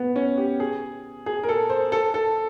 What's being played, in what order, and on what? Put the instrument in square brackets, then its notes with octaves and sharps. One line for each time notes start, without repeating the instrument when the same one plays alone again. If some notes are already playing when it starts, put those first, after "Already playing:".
Already playing: [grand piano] B3
C#4
G4
G#4
G#4
A#4
A4
C5
A4
A4